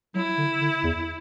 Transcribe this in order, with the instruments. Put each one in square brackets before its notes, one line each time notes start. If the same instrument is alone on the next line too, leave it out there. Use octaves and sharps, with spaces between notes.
[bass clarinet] F#3 [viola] E4
[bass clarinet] D3
D3
E2